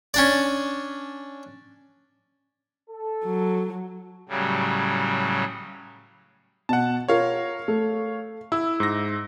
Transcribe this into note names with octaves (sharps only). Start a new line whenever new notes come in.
C#4 D4 D5
A4
F#3
A2 C#3 F#3 G3
B2 F#5 A5
F4 A#4 C#5 F5
A3
E4 E6
G#2 A#6